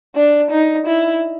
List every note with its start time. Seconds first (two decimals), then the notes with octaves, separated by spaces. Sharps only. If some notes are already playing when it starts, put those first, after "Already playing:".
0.16 D4
0.51 D#4
0.86 E4